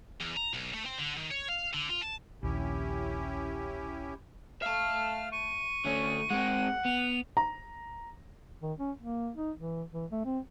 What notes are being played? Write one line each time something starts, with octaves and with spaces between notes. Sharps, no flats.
E2
A#5
B1
A3
C4
D3
D#3
C#5
F5
D3
F4
A5
A#1 D#2 C#4 E4 G4
E5 F5 A5 F6
C#6 D#7
D3 A3 C#4
G#3 C4 F#5
B3 F7
A#5
D#3
C#4
A#3
D#4
E3
E3
A3
C4